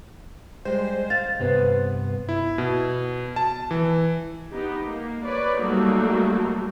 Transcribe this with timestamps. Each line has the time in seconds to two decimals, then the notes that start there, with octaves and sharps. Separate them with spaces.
0.65 G3 G#3 C5
1.10 F5 A6
1.39 C2 G2 B3 B4 C5
2.29 E4
2.58 B2
3.36 A5
3.71 E3
4.53 B3 D#4 G4
4.87 A#3
5.24 B4 C#5 D5
5.60 F#3 G3 A3 A#3 D#4 F#4